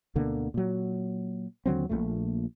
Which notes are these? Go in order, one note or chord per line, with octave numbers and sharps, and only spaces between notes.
D2 B2 D3 A#3
A#2 F#3
D#2 D3 F#3 C4
A#1 D#2 A#2 A3